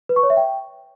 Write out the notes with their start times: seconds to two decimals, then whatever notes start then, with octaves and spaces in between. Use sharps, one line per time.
0.09 B4
0.16 C#6
0.23 C#5
0.30 E5
0.37 G5